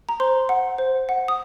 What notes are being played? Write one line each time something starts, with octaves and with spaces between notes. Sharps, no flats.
A#5
C5 C6
F#5
C5
F#5
D#6